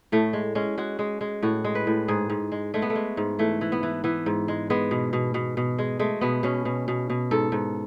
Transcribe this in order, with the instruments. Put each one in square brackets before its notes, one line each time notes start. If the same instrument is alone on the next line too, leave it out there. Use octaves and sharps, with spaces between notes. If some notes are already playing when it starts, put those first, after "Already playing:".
[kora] A2 A3
G#3
G#3 C#4
G#3 F#4
G#3
G#3
A2 F#4
G#3
B4
A2
G#2 G#4
G#2
G#3
G#3 A3
B3
A3
G#3
G#2
E3 A3
E3
B3
E3
E3 B3
G#2
G#3
G#3 B3
B2
B2
B2
B2
G#3
G#3 A3
B2 B3
B2 C#4
B2
B2
B2
G#2 A4
G#2